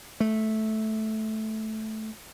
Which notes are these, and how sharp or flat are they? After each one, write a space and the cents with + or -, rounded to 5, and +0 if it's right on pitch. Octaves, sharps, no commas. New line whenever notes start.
A3 -10